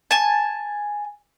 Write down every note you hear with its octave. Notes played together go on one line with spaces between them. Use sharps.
G#5 A5